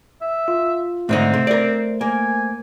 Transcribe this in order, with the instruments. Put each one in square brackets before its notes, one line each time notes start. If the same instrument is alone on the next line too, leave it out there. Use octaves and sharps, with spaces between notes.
[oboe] E5
[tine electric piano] F4
[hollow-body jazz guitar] G#2 D3 D#4 [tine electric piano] A3 C5 [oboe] C4
[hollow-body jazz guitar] C3
A#4 D5
[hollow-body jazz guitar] A#3 [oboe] G#5